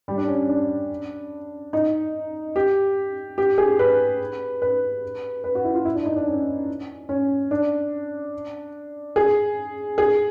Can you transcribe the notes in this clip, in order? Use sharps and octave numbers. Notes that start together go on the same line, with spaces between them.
G3
D4
C#4
D4
D#4
G4
G4
G#4
B4
B4
B4
F#4
E4
F4
E4
D4
D#4
D4
C#4
C#4
D4
G#4
G#4